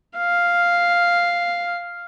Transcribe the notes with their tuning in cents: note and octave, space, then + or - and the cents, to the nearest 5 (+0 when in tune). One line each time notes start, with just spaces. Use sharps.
F5 +0